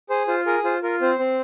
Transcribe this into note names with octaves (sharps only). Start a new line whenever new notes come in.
G#4 C5
F4 C5
G#4 A#4
F4 C5
F4 A#4
C4 C5
C4